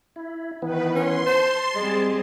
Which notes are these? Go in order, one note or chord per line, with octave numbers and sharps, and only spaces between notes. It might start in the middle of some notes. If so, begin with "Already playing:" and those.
E4
D#3 E3 B3 B4
C#4 C6
C5 A5
G3 G#3 C4 G#4